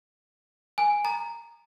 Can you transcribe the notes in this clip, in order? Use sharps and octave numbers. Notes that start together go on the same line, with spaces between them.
G#5
A#5